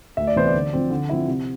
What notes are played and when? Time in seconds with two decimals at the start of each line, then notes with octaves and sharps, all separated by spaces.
0.17 D2 E5
0.27 D5
0.36 C3 E3 B3 C5
0.48 D5
0.54 D3
0.73 F3 C4
0.90 D3
1.09 F3 C4 E4
1.27 C3